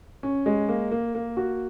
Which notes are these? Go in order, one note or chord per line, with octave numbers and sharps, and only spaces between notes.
C#4
G#3
A#3
A#3
A#3
F#4